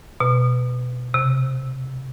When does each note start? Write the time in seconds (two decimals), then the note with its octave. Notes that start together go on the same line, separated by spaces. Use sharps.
0.20 B2
1.14 C3